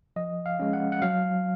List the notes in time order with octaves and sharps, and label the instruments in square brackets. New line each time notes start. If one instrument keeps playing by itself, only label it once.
[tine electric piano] F3 D#5
F5
G#3 C#4
F#5
F#5
F#3 F5